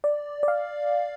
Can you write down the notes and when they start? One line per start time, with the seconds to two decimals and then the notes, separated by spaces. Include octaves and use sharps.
0.04 D5
0.43 D5
0.48 F5